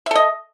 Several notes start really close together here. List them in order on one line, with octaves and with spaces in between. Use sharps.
E5 A4 D#5